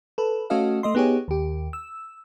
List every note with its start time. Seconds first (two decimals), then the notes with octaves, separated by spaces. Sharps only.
0.18 A4 B4
0.50 A3 C#4 F#4 A4 D#5 F5
0.83 A3 D#5 C6
0.95 B3 D#4 G4 G#4 C#5
1.28 D#2 G4
1.73 E6